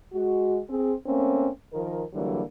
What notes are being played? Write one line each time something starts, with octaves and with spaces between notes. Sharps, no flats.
G#3 F#4
C4 G#4
A3 A#3 C4 C#4
D#3 F3 A#4
D3 E3 F#3 G3 A#3